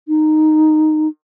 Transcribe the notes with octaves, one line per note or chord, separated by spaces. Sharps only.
D#4